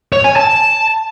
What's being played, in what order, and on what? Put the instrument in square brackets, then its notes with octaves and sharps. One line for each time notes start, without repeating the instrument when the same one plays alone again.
[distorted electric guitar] C#5
G#5
A5